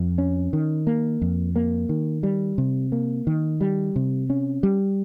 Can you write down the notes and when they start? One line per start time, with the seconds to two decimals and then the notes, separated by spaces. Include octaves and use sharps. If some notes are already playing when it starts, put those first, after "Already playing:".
Already playing: F2
0.18 C#4
0.53 D#3
0.87 A#3
1.22 F2
1.56 A#3
1.89 D#3
2.23 G3
2.58 C3
2.92 A#3
3.27 D#3
3.61 G3
3.96 C3
4.30 C#4
4.63 G3